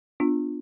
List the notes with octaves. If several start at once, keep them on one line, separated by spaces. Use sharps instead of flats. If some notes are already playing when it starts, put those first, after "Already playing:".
B3 D4 F4